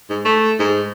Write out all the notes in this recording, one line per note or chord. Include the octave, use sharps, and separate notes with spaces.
G#2
A3
G#2